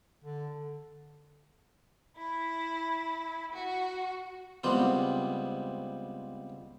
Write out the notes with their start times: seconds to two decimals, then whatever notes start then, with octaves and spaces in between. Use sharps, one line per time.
0.24 D3
2.17 E4
3.53 F#4
4.64 C#2 G3 B3 C4